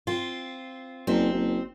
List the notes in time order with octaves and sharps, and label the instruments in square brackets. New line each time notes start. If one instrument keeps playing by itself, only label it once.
[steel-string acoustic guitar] C4 F4
[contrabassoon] F#1 [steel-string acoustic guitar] C4
[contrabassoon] F#1